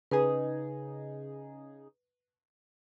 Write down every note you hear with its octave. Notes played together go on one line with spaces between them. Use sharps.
C#3 D#4 G#4 B4